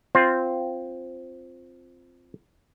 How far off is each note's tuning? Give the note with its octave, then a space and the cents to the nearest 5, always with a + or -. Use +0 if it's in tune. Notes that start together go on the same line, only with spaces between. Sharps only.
C4 +0 F4 +0 C5 +0